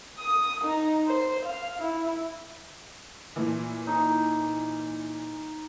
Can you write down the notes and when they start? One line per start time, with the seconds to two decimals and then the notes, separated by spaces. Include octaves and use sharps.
0.19 D#6
0.64 D#4
1.07 C5
1.45 F5
1.80 E4
3.36 A#2 E3
3.87 D#4